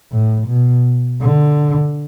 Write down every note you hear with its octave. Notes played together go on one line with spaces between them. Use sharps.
A2
B2
D3